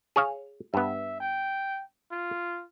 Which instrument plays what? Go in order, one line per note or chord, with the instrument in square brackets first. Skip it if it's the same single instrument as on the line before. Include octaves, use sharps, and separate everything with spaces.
[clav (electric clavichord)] G#4 C#5 F5
[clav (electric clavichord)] G2 B3 [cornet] E5
[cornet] G5
F4